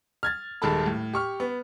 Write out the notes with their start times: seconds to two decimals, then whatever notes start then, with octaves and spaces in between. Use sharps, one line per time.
0.23 F6 G#6 A6
0.62 D#1 D#3 G#3 A4 A5 B5
0.86 A2
1.13 G4 C#6 F6
1.40 B3